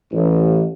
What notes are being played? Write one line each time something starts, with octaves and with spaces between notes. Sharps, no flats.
A1